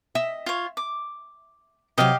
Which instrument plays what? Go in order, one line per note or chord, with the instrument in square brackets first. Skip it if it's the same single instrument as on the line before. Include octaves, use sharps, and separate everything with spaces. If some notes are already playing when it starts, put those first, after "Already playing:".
[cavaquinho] D#5 [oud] E5
[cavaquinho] F4 C#5
D6
[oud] C3 F#3 [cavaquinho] G4 D#5 F5